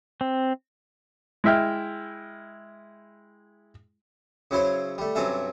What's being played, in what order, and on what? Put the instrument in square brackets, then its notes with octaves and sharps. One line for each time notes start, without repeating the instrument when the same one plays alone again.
[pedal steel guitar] C4
[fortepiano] G#3 E4 E5 G5 F6
[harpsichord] C#3 F#3 E4 C5 C#5
G3 A3
G2 C3 F#3 C#4 A4 E5